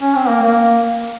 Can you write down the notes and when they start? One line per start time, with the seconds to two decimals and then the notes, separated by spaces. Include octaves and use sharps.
0.01 C#4
0.16 C4
0.29 A#3
0.42 A#3